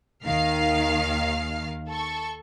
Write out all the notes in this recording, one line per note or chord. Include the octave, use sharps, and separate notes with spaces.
D#2 D#3 F5 F6 C7
A4 C#6